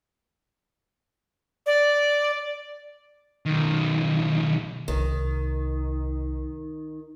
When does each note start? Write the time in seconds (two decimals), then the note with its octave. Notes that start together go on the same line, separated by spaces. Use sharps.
1.66 D5
3.46 B1 D#3
4.88 C2 D#3